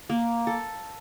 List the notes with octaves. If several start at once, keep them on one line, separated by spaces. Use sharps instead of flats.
A#3
A4